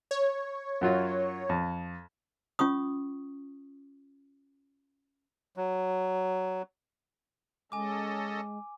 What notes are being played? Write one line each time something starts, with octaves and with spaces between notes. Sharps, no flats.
C#5
F#2 F#3 F4
F2
C#4 F4 C#6 D#6
F#3
G#3 C#4 A4 D#5 G#5 D6